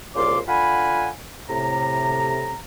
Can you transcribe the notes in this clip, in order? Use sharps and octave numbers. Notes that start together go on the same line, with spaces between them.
C2 A#2 C#3 F4 C6 D6
D3 F4 F#5 G#5 B5
A2 C3 A#5